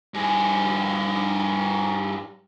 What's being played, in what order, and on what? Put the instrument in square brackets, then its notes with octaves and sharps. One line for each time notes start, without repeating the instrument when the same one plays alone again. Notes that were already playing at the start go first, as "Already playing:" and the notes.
[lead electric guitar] G2 G#4